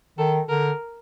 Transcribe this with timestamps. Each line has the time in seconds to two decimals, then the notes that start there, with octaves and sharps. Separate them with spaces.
0.18 D#3 A4
0.49 D3 A#4